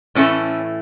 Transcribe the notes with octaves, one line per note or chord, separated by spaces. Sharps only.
A2 E3 A3 C#4